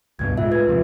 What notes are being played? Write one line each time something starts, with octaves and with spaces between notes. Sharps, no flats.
C#2 G2 B2 G#6
A2 G#3 F4 E5
B4 G#6
D#2 C3 F3